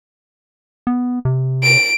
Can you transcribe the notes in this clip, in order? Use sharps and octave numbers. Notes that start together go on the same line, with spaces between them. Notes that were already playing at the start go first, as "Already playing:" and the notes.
B3
C3
D7